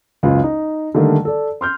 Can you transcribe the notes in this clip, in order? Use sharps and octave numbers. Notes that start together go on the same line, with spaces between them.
F#1 C#2 F4
D#4
D3 D#3 G3 A3 A#3
A4 D5
C6 F6 G6